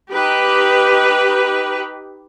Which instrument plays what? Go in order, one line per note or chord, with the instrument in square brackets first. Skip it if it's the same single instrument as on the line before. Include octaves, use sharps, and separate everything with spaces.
[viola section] D#4 G4 B4